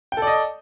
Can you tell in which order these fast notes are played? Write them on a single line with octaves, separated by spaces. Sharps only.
G5 A4 D5 D#5